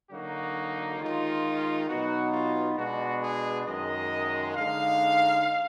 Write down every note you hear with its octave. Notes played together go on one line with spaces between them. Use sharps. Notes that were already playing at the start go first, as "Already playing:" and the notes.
D3 F#3 A#3 D#4 F#4
D#3 G#3 D#4 F4
B2 F#3 B3 D#4 F#4
F4
B2 G#3 D4 F#4
G#4
F#2 D#3 G#3 D#5
D3 G#3 D#4 F5